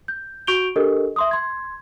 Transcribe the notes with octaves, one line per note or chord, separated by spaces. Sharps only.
G6
F#4 C#6 G6 D7 F7 G7
D4 G4 A4 A#4 D#5
E5 C6 D#6
C6 G#6